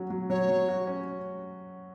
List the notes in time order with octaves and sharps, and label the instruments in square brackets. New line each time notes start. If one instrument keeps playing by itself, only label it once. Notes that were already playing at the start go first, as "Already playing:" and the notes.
Already playing: [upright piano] F#3 C#4 F#4
F#3
[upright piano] F#3 [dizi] C#5
[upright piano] F#3
F#4
C#4